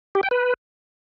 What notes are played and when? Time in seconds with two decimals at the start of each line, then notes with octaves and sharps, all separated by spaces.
0.15 G4
0.23 G5
0.31 B4